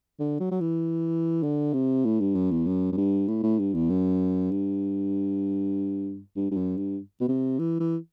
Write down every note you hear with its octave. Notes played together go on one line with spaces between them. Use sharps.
D3
F#3
F#3
E3
D3
C3
A2
G2
F#2
E2
F#2
F#2
G2
A2
A2
G2
E2
F#2
G2
G2
G2
F#2
G2
B2
C3
E3
E3